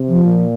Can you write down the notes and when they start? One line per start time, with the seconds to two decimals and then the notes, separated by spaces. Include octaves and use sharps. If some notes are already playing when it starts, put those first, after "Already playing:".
Already playing: C3
0.08 F3
0.25 A#2